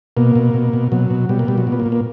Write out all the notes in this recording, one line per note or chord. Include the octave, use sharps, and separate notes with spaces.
B2 A#3
B2
B2
B2
B2 F#3
B2
B2 G3
A#3
B2 G3
F#3
A#2
B3
A#3
A#2
A#3